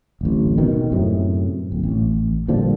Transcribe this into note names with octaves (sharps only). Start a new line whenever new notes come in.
D1 A1
D#2 B2 D#3
F#2 A2 C3
D1
A1
A#2 D3 F3 G3